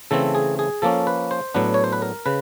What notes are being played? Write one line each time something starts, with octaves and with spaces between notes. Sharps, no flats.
C#3 E3 A3 C4 A4
G#4
G#4
F3 A#3 C#4 A4
B4
C5
A2 F#3 B3 D4 B4
C#5
C5
B4
A#4
C#3 B4